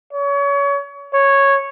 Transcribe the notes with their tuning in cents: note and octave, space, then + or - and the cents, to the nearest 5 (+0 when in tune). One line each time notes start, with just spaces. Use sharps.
C#5 +30
C#5 -5